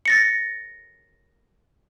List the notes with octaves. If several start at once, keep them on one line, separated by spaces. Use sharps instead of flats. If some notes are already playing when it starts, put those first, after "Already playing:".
A6 A#6 C#7